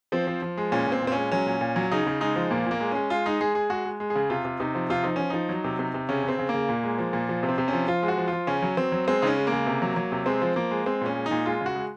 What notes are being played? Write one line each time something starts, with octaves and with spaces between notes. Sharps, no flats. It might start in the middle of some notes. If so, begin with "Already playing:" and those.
F3 C4
F3
F3
G#3
A#2 C#4
A#2 C4
A#2
C4
G#3 C#4
F#3 C#4
A#2
A#2
F#3
C#3 D#4
C#3
G#3 D#4
F3
A#2 A#3
A#2
A#3
G#3
G#3 C#4
G#3 F4
G#3 D#4
G#3 G#4
G#3 G#4
G#3 F#4
G#3
G#3
G#4
C#3
C3 F4
C3
C3 D#4
F3
C3 F4
F3 D#4
F3 C#4
F3 D#4
F#3
C3
C3
C3
C#3 C#4
C#3 C4
C#3
C#3 A#3
A#2
G#3
F3
A#2
F3
C3
C4
C3
F3 C#4
F3 F4
G#3
F#4
F3
F3 F4
C#3 C#4
F#3
F#3 C4
F#3
G#3 C4
C#3 C#4 D#4
G#3
A#3
C#3
C3
F#3
F#3
C3
G#3 C4
F3
F3 A#3
G#3
G#3 C4
A#2 C#4
G#3
D#4
A#2
G#3 F4
C#3
F#4
G#3